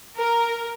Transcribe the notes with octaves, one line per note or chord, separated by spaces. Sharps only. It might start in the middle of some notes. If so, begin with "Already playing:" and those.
A#4